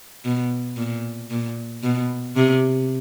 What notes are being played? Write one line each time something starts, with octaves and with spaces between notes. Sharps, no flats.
B2
A#2
A#2
B2
C3